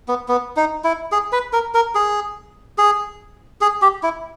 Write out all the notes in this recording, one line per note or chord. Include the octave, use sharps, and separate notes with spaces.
B3
B3
D#4
E4
G#4
B4
A#4
A#4
G#4
G#4
G#4
G4
E4